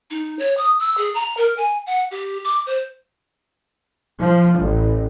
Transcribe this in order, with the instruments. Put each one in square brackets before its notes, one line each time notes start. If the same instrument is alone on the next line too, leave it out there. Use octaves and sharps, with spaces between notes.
[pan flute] D#4
C#5
D#6
E6
G#4
A#5
A#4
G#5
F#5
G4
D6
C5
[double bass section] F3
A1